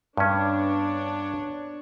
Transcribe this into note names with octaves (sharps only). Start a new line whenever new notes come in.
G2 B3 C#4 D4 C#5